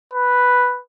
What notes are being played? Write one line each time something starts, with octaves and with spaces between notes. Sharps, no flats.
B4